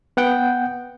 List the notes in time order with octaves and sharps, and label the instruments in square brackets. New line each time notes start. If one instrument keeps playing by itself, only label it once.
[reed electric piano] B3 F#5 G5 G6